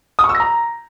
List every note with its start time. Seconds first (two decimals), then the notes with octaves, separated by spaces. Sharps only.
0.19 D#6
0.24 C#6
0.29 E6
0.35 A#6
0.40 A#5